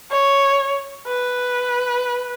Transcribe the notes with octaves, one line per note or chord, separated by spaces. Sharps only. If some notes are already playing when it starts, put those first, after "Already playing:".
C#5
B4